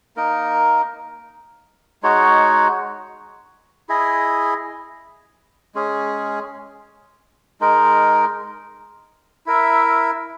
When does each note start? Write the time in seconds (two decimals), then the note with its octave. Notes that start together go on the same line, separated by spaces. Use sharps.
0.16 A#3 D#4 A#4
2.03 G#3 D#4 F#4 C#5
3.89 E4 G#4 D#5
5.75 G#3 C#4 G#4
7.61 G#3 D#4 A#4
9.46 E4 A#4 E5